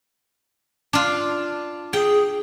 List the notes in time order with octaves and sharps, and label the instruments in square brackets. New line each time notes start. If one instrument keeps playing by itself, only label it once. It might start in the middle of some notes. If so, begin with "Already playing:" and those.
[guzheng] D4 F4
[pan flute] G#4 [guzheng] G5